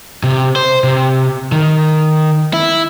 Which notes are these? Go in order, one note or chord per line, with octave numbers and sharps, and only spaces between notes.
C3
C5
C3
D#3
E4